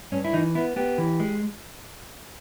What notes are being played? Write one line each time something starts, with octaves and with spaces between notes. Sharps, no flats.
G2 C#4
E4
E3 D#4
B3 E4
B3 G4
E3
G#3